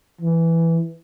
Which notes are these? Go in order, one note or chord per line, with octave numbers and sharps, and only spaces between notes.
E3